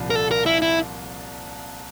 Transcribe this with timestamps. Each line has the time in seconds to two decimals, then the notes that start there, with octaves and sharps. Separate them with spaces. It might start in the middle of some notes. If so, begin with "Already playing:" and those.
Already playing: C2 A#2 F3
0.10 A#4
0.15 A4
0.31 A#4
0.46 E4
0.62 E4